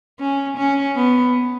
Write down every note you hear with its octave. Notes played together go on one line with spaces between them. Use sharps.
C#4
C#4
B3